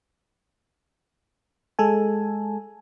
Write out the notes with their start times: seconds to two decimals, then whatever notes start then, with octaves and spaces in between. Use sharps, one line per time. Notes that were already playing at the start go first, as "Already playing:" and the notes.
1.79 G#3 A4 G#5